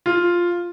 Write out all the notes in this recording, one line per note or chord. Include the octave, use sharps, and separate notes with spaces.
F4